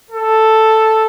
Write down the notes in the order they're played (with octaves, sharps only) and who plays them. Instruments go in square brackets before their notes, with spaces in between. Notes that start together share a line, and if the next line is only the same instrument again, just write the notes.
[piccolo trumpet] A4